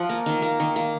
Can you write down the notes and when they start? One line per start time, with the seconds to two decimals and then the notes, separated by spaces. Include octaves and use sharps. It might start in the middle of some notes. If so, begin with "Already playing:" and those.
Already playing: F3 F#5
0.09 A#3
0.26 D#3
0.42 A#3
0.60 D#3
0.76 A#3